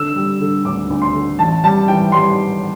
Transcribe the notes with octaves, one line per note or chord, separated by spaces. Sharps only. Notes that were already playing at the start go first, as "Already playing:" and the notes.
Already playing: D3 E6
G3
D3
D2 D6
D2
C6
D3
A1 A5
G3 A5
E3 G5
G3 C6